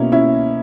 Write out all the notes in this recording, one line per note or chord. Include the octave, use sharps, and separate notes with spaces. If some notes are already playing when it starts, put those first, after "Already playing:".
Already playing: B2 A#3 C#4 E4
C#4 E4